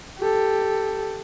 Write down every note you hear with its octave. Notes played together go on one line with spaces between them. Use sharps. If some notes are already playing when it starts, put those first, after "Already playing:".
G4 A4